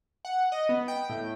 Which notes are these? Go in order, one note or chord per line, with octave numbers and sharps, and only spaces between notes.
F#5
D#5
B3
G5
A2